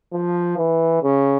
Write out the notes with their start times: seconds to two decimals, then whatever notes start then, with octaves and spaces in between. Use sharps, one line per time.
0.13 F3
0.57 E3
1.03 C#3